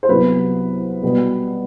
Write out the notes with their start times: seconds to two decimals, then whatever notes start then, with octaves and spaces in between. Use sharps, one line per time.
0.03 C5
0.09 C2 C3 F#3 B3 B4
1.03 B2 G3 B3